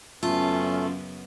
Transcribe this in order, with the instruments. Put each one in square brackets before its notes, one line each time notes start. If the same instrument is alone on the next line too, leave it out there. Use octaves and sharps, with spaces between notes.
[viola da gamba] F#2 C#3 B3 [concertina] A3 A4 [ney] C#4 [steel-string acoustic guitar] F4